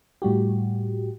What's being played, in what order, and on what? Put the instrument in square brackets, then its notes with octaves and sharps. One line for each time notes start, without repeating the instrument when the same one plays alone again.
[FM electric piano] A2 G3 F#4 G4